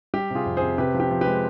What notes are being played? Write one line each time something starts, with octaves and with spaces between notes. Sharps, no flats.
G3 G4
C3 F4 G#4
F2
G#4 C5
C3
C3 G4 B4
F3
G4
F3
G4 B4
G#3